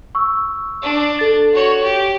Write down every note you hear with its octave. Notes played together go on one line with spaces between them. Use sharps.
C#6 E6
D4
A4 A6
F#4 C#5
G4